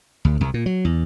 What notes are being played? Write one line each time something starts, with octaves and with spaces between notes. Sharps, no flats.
D2
C2
A#2
F#3
E2